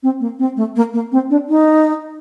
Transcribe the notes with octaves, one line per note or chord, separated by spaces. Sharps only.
C4
A#3
C4
A3
A#3
A#3
C4
D4
D#4